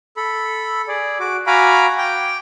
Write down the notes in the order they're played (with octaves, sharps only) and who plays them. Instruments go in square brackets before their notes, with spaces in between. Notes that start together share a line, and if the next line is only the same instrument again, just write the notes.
[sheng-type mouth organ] A4 B5
G#4 D5
F#4 D6
F#4 F5 G#5 A#5 B5 D6
G5 D6